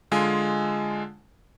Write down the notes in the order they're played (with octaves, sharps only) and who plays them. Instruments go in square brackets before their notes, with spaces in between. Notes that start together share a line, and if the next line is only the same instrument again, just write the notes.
[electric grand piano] D3 G#3 F4 G#5